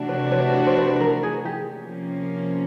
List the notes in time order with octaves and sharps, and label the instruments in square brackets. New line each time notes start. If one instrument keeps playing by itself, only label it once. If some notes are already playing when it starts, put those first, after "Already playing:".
Already playing: [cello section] C3 E3 A3 D4 F#4
[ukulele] B4 C#5
B4 C#5
B4 C#5
C5
B4
B4
A#4
G#4
G4
[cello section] C3 F3 A#3 C#4